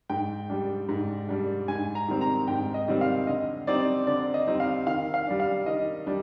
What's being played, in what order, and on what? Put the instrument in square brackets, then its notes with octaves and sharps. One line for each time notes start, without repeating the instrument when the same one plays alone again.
[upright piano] G#2 [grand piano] G5
[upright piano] G3 D4
G#2
G3 D4
[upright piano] G#2 [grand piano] G#5
[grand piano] A#5
[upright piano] D#3 G3 C4
[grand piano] A#5
[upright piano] G#2 [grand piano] G5
[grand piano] D#5
[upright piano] D#3 G3 C4
[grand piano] F5
[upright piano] D3 [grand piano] D#5
[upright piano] G3 C4 D#4 [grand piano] D5
[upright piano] D3 [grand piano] D5
[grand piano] D#5
[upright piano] G3 C4 D#4
[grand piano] F5
[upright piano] D#3 [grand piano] F5
[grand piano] F5
[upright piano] G3 D4
[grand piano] F5
[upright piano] D#3 [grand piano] D#5
[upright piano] G3 D4